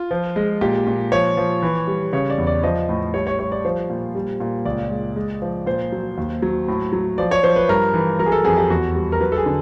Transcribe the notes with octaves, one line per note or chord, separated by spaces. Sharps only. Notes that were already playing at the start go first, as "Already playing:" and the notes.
Already playing: F4
F3
G#3
A#2 G4
A#2
F3 C#5
F3
E3
G3
C#3 C#5
D5
E2
D5
F3 D#5
A2
G3 C#5
C#5
G3 C#5
D5
F3 C5
A#2
G3
A#2
C#2 D5
G#3
G#3
F3
A#2 C5
F#3
D#2
F#3
A2
F#3
F3 D5
C#5
F3 C5
B4
G2 A#4
E3
F#3 A#4
G#4
A4
F2 G#4
G4
E2 F#4
G3
A#4
F#3 B4
A4
G#4
D3